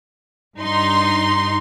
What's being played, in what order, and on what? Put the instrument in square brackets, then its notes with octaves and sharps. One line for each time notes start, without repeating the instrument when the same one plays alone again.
[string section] G2 D#4 C6